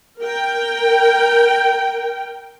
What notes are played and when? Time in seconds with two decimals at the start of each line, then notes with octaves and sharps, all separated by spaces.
0.23 A#4 G5